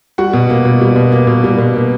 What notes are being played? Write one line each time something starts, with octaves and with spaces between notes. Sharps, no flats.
G3 F#4 F#5
B2
A#3
B2
G3
B2
A#3
B2
G3
B2
A#3